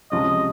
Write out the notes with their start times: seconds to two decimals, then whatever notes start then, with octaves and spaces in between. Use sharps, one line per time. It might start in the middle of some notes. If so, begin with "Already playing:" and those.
0.11 C#2 C3 F3 G#3 C#4 D#5